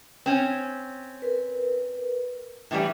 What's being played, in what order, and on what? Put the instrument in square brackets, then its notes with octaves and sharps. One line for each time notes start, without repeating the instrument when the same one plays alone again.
[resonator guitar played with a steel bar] C4 C#4
[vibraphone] A#4 B4
[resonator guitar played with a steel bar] A2 E3 G3